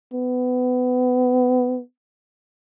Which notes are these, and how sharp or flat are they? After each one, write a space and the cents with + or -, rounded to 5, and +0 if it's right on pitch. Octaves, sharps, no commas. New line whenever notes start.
B3 +25